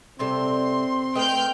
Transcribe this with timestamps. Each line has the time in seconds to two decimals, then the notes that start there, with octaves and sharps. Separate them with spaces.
0.19 C3 G3 C4 A4 C6
1.15 A3 B4 D#5 G5 F6 G6